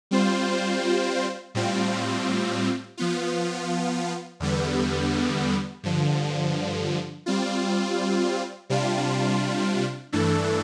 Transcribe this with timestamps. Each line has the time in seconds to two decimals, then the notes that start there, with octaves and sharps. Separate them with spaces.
0.11 G3 C4 F4 C5
1.55 A2 G3 C4 F4
2.97 F3 B3 F4
4.40 E2 D3 G3 B3
5.83 G2 D3 F3
7.26 G3 C4 F4
8.70 C3 G3 D4 F4
10.12 G2 E3 A3 D4 A4